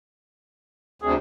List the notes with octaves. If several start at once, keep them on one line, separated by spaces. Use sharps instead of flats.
D2 C3 G#4